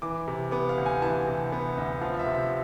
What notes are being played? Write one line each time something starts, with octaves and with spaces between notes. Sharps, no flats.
E3 D6
C3
B3 D6
F5
D2
G#5
E3 A5
C3
B3
D2
F3 F5
E5
C3
E5